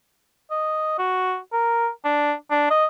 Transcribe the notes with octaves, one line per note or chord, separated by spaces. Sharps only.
D#5
F#4
A#4
D4
D4
D#5